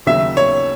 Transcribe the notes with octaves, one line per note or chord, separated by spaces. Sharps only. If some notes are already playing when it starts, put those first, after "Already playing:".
D#2 C#3 F#3 E5
C#5